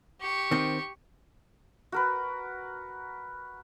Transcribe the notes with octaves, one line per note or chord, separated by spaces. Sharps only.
G4 C#6
D#3 C4
F#4 A#4 B4